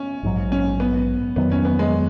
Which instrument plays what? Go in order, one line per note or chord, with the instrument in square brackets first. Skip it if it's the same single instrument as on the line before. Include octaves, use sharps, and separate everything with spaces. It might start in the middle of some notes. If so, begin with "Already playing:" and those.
Already playing: [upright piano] C#4
[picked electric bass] A#1 G#2 F#3
[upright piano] C#4
B3
[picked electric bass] F2 D#3 F#3 [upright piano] B3
[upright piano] C#4
B3
G#3